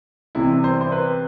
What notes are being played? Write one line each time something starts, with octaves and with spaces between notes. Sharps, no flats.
C2 C3 E3 E4
C5
C5
B4